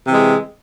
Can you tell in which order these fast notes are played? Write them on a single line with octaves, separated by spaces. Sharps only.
C3 E3 G#3